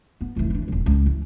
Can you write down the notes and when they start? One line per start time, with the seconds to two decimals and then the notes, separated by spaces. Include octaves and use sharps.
0.21 B3
0.36 F1 E3
0.50 E3 D4
0.68 D#1 G#1
0.86 C#2
1.06 E3